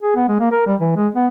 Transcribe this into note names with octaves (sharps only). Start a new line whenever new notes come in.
G#4
B3
G#3
A#3
A#4
G3
E3
G#3
B3